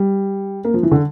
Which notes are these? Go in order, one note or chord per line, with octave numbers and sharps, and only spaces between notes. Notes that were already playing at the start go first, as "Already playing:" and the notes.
Already playing: G3
A#3
F3
E3
D3